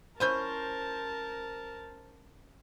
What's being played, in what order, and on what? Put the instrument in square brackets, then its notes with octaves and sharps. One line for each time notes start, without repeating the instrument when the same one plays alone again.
[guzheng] C#4 E4 G#5 [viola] A#4 A5 [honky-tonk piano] C5 G6